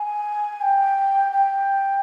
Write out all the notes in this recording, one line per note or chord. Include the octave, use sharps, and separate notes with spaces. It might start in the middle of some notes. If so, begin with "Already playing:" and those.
Already playing: G#5
G5
G5